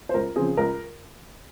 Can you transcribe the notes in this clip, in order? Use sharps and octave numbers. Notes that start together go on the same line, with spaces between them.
C5
C#2 A#4
C#3 F3 C4 G#4
C#2 A#4